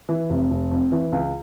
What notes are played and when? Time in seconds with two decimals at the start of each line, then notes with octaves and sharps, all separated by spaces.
0.09 E3
0.30 F1
0.51 F1
0.71 F2
0.92 E3
1.12 C#2